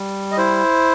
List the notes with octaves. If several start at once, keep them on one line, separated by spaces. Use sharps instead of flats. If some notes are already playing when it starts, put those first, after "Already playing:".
Already playing: G3
D#5
E4 C5